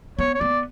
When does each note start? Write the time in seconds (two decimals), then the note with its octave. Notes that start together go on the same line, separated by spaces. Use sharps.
0.19 B3 C#5
0.34 C#5
0.40 B3 D5